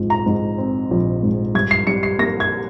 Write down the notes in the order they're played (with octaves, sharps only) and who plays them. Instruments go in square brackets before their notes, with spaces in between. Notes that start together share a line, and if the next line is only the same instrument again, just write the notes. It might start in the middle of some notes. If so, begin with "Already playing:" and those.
Already playing: [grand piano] A#1 G#2 F3
A#5
G#2
C4
A#1
G#2
G2 G#6
C7
G3 C#7
C7
A#3 A#6
G#6